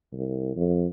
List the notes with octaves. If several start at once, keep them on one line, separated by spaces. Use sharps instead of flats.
C2
F2